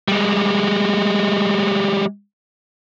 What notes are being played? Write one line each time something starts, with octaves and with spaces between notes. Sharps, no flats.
G3 G#3